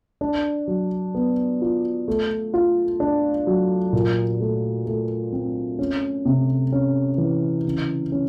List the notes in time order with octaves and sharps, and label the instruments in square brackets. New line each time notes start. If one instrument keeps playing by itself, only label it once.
[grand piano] D4
F#3
B3
F4
A3
F4
D4
F#3
A#2
A3
A3
C4
C#4
C3
C#4
E3
C#3
C#4